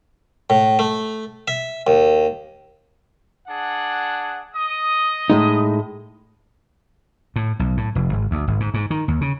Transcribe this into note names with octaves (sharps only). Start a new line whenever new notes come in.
A2
A3
E5
D#2
D4 G#4 F#5
D#5 D#6
A2 G#3 D#4
A2
B1
A2
F1
G#1
D2
G#1
G#2
G#2
D#3
D#2
C#3